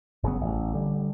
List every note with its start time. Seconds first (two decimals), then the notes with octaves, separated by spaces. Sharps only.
0.23 G1 C#3 F#3 B3
0.41 A1
0.73 D3 G3